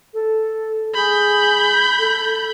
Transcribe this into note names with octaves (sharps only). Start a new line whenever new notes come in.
A4
G#4 B5 G6
A4